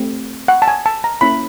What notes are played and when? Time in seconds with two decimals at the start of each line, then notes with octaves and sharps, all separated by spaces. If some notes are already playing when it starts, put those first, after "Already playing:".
Already playing: A3 C4 G4
0.48 F#5
0.62 A5
0.68 G#5
0.86 A5
1.04 A#5
1.21 A#3 C#4 E4 B5